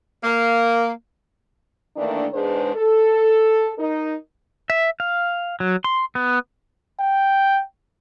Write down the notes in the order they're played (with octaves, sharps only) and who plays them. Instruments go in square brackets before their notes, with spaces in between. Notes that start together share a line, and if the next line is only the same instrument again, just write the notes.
[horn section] A#3
[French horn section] D#3 E3 A3 A#3 D4
E2 G#2 G#3 D4 B4 C5
A4
D#4 A#4
[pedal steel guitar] E5
F5
F#3
C6
B3
[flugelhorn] G5